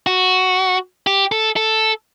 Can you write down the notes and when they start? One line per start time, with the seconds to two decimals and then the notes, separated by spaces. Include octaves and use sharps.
0.07 F#4
1.07 G4
1.32 A4
1.56 A4